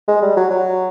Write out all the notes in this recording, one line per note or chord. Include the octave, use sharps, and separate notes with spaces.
G#3
G3
F#3
F#3